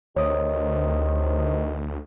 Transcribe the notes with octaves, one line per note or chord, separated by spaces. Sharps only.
D2 C3 D#3 C#5 D#6